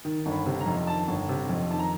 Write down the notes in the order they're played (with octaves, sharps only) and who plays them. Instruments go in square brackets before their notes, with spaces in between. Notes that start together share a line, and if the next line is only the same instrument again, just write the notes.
[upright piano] D#3
G1
B5
C3
A#5
F2
D#3 A5
G1
C3
F2
D#3 A5
A#5